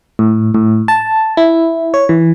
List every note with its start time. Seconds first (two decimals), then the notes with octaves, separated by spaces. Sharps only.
0.19 A2
0.54 A2
0.88 A5
1.37 E4
1.94 C#5
2.09 E3